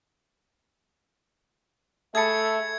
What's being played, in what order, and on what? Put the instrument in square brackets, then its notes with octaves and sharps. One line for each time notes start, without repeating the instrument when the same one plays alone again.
[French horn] A3 [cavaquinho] G#4 A5 B5 [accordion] E5 [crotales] G#6 C#7